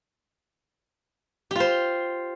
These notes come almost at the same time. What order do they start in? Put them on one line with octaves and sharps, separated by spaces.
G4 F4 C5